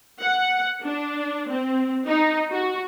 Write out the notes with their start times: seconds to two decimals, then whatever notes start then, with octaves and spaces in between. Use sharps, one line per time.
0.22 F#5
0.84 D4
1.51 C4
2.08 D#4
2.51 F#4